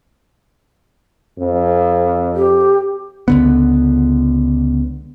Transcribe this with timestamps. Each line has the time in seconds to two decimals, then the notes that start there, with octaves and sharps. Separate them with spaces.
1.39 F2
2.35 G4
3.28 C#2 D3 B3